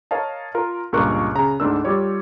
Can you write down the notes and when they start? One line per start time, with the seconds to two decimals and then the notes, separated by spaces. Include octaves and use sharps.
0.11 A#4 C#5 D#5 F5 A5
0.55 F4 A#4
0.92 C#2 G2 A#2 A#4 C#6 F#6
1.35 C#3 A#5
1.60 D2 G#2 D4 A#4 E6
1.84 G3 F4 G4 C#5 D5